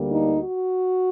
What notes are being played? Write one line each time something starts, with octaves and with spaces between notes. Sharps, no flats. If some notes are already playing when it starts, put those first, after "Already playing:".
Already playing: D2 D3 G3 A#3
D#4
F#4